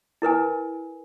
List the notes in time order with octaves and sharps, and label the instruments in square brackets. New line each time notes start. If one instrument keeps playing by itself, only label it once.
[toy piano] E4 A#4 B4 G#5